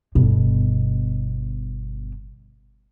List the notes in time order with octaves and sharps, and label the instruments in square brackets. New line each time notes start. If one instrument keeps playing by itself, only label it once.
[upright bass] G1 B2